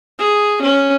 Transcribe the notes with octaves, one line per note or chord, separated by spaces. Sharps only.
G#4
C#4